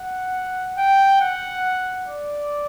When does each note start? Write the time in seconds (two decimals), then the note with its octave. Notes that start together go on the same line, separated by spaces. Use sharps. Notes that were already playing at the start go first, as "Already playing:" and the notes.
Already playing: F#5
0.78 G5
1.21 F#5
2.08 D5